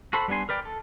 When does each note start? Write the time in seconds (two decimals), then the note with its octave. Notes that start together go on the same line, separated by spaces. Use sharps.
0.13 F#4 A4 C5 B5
0.28 G3 B3 D4 G#5 C6
0.49 A#4 B4 D5 G5
0.65 A4